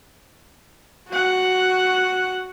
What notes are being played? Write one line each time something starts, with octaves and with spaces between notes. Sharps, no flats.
F#4 F#5